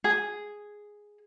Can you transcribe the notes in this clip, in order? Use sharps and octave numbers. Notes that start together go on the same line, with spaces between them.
G#4